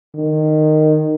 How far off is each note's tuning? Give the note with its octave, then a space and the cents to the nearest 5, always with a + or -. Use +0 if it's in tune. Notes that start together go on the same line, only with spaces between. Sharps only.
D#3 -15